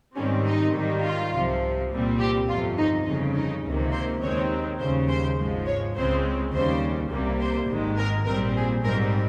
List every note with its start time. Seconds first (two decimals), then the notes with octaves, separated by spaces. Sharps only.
0.16 G#2 D#3 G3 C4 C#4
0.45 D#4
0.74 G#2 D#3 G3
1.03 F4
1.33 C2 C3 F3
1.91 C2 A#2 G3 C4
2.19 G4
2.48 G1 F2 C3 F4
2.77 D#4
3.06 G1 F2 C#3 D#4
3.34 D#4
3.63 C#2 C3 D#3 A#3
3.93 C5
4.21 D#2 D#3 G#3 C4 C#5
4.79 D#2 C#3 G3 C5
5.08 C5
5.38 G#1 G#2 F3 G#3
5.67 C#5
5.94 C#2 C#3 G#3 C4 C5
6.53 D#2 C#3 G3 C5
7.11 C2 C3 G3 A#3
7.40 C5
7.69 G#1 G#2 D#3 G#3
7.98 A#4
8.26 A#1 A#2 G3 C4 A#4
8.56 G#4
8.84 G#2 G3 C4 A#4